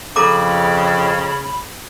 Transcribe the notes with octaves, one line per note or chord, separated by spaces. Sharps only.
F2 C#3 A4 A#5 B5 D6